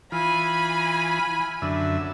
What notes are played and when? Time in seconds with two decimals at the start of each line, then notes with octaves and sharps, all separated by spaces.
0.12 E3 F4 G#5 B5
1.62 F#2 D3 E5